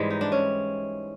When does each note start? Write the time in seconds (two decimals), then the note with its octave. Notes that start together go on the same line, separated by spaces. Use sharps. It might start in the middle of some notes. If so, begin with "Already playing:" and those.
Already playing: G#2 E3 G3 G#3
0.10 D#4
0.21 D4
0.32 C#4